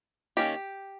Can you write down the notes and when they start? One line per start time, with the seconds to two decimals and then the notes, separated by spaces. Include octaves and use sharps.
0.37 D#3 A#3 C#4 G4